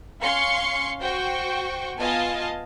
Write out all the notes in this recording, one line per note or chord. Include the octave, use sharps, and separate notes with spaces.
C#4 F5 C6 C#6 C#7
F#4 C5 G5 C#6
B3 F4 D#5 F5 G#5 A5